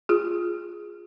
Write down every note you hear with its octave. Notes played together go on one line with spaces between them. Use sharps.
F4 G#4